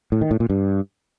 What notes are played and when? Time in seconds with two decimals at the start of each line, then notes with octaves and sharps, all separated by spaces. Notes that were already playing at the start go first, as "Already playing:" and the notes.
0.12 A2
0.21 D#3
0.31 A2
0.40 A#2
0.50 G2